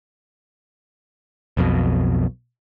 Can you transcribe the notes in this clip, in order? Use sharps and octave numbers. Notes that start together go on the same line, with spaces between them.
B1 F2 B2